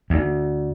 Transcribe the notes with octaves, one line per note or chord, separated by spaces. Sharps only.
D2